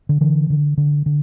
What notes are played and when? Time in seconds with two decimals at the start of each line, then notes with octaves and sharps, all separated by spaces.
0.09 D3
0.21 D3 E3
0.50 D3
0.78 D3
1.06 D3